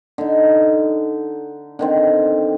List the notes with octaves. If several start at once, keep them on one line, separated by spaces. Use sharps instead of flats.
D3 D#4
D3 D#3 C4